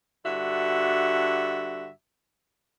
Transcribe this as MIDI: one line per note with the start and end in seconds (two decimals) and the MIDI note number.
0.25 1.90 43
0.25 1.90 50
0.25 1.90 66
0.25 1.90 76